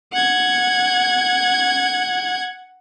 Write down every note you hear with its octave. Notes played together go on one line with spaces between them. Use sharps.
F#5 G#6